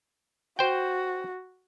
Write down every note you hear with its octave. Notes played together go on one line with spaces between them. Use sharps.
F#4 C5 G5